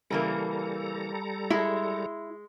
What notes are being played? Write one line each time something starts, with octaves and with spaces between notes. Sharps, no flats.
C#3 E3 G3 A#3 A4 A#5
G#3 E4